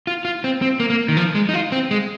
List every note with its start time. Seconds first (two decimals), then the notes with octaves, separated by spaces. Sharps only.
0.07 F4
0.25 F4
0.44 C4
0.62 C4
0.80 A#3
0.90 A#3
1.08 D#3
1.17 F3
1.35 G#3
1.49 D#4
1.54 F4
1.72 C4
1.91 G#3